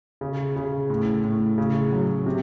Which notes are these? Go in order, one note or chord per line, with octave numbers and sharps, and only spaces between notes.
C#3
C#3
A2
A2
C#3
F#3
C3